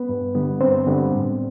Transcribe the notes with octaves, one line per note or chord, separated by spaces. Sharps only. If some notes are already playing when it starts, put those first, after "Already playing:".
Already playing: B3 B4
G2
D3 G3 B3
G2 C4 C5
D3 G3 B3
A2